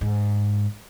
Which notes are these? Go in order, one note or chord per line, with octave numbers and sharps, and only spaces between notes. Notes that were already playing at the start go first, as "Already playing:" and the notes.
G#2